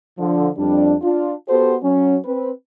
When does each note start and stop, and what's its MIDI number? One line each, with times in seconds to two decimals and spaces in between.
0.18 0.47 50
0.18 0.47 53
0.57 0.94 41
0.57 0.94 55
0.57 0.94 62
1.02 1.33 62
1.02 1.33 65
1.48 1.75 59
1.48 1.75 66
1.48 1.75 67
1.48 1.75 69
1.48 1.75 72
1.83 2.17 54
1.83 2.17 61
2.25 2.49 60
2.25 2.49 71